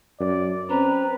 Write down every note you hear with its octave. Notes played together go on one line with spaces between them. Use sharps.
F#2 D5
C4 C#4 B4 A#5